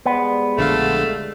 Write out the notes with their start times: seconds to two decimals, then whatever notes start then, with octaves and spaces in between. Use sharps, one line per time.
0.06 G3 G#3 B3 C5
0.57 A#1 D3 A3 F5